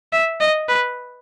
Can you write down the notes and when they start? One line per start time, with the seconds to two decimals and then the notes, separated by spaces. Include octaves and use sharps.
0.13 E5
0.40 D#5
0.68 B4